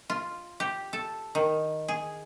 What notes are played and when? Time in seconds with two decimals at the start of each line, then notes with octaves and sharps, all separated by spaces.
0.10 F4
0.60 G4
0.93 A4
1.35 D#3
1.88 G#4